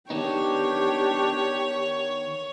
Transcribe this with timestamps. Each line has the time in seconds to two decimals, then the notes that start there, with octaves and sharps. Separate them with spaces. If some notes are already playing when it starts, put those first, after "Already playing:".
0.10 D#3 B3 D4 D#4 G4 C#5